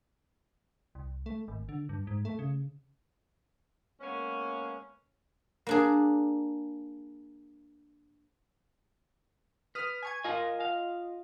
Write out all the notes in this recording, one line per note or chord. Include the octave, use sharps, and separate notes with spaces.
C2
A3
G#1
D3
G2
G#2
A3
C#3
G#3 A#3 B3 C#4
A#3 D4 G#4
B4 D#6 F6
G#5 C#6 G#6
F4 A#4 D#5 G#5
F5